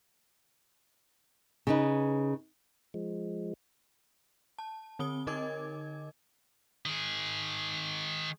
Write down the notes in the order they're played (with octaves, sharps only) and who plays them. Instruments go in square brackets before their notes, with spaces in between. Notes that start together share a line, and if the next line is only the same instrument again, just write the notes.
[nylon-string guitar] C#3 D#4 B4
[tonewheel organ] F3 G#3
[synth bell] A5
D3 C4 D#6 G7
D3 D#4 A#4 D#5 D6 G#6
[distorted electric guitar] D#3 G#4